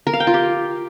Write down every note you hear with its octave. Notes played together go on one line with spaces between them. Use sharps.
A#4
F5
G5
F4
G4